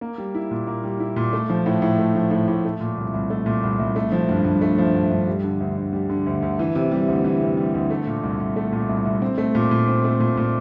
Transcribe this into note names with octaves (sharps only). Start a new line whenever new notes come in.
A#3
G3
E4
A#2
A#3
G3
E4
A#2
A3
F3
A2
A2
A3
F3
A2
A2
A3
A#2
C2
C2
A3
A#2
C2
C2
A3
F3
G2
G2
A3
F3
G2
G2
G3
D3
D2
D2
G3
D3
D2
D2
E3
C3
G3
D2
E3
C3
G3
D2
A3
A#2
C2
C2
A3
A#2
C2
C2
C4
A3
A#2
A#2
C4
A3
A#2
A#2